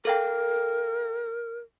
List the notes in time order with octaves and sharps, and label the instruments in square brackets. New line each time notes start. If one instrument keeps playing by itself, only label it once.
[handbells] A4 F5 G5 [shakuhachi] A#4